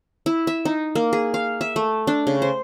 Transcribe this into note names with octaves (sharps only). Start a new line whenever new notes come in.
E4
E5
D#4
A#3
G#4
F5
E5
A3
D4
C#3
C5